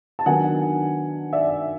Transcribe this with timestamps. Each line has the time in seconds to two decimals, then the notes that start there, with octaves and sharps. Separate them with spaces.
0.19 A5
0.26 D#3 F#3 B3 D4 F#5 G#5
1.33 D5 E5